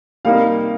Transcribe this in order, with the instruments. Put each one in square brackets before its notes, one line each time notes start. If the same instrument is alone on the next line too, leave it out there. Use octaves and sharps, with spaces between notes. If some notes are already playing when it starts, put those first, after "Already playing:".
[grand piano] C3 G3 A#3 D#4 F5